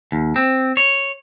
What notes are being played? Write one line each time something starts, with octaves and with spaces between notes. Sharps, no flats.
D#2
C4
C#5